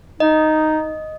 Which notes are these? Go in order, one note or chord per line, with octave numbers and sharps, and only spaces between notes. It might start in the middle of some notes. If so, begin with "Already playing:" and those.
D#4 D#5